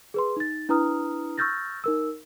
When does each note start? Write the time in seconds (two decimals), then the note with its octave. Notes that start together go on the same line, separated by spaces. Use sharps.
0.14 G#4 B4 C6
0.37 D#4 A6
0.69 D4 E4 B4 A#5 D#6 F6
1.38 C#6 E6 F6 G6 A6 A#6
1.84 D#4 A#4 E6